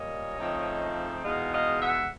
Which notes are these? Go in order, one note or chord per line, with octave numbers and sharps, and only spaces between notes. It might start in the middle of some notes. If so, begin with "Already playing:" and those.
Already playing: A#2 G3 A#3 C#5 D#5
C#3 F3 A3 C4 D#4
E2 B2 G#3 B3 D#4 D#5 F5
D#5 F5
E5 F#5